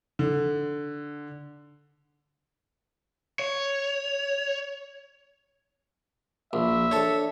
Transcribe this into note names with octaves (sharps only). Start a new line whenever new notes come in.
D3
C#5
A#1 E5
D4 A4 C#5